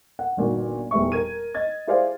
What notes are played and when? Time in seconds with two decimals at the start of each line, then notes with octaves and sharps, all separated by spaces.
0.19 F#5
0.37 G1 A#2 D#3 F#4
0.91 D#1 E2 E5 C#6
1.12 A#4 G#6 D#7
1.55 D#5 G#6 A6
1.87 E4 G4 G#4 C5 D5 F5